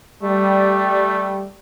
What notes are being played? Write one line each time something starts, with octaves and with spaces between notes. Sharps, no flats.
G3 A3